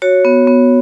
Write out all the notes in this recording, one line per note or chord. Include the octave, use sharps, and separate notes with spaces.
F#4 C#5
B3
B3